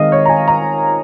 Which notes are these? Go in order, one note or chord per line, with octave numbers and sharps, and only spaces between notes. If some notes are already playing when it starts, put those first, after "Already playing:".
Already playing: D#3 G#3 C4 D#5 F5
C#5
A#5
G#5
A#5